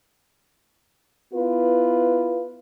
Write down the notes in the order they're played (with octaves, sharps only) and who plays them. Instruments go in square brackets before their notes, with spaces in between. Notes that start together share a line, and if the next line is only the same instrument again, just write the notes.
[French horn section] B3 E4 F4 B4